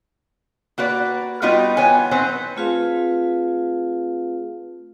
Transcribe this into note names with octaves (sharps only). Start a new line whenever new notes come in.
A#3 F#4 B4 D5
G3 B3 D#4 F4 F#4 B4
E3 B3 C#5 G#5
F#3 C4 D#4 B4 C5
A3 C4 F4 G#4 B4 F5